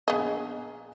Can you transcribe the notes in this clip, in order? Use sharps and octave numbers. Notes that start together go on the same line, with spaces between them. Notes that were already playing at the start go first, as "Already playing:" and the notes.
A#1 B3 G#4 D#5